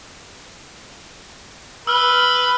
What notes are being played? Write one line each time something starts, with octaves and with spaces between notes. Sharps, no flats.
B4 E6 F6 G7